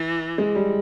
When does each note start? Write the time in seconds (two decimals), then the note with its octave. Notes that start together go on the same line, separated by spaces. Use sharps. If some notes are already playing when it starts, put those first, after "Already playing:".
Already playing: E3
0.38 G#3
0.55 G3